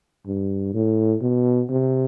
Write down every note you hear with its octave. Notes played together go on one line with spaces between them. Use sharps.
G2
A2
B2
C3